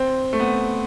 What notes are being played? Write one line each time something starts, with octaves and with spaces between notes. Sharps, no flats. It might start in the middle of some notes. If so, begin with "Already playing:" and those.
Already playing: C4
A3
B3